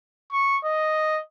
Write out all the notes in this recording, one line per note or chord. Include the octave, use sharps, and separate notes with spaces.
C#6
D#5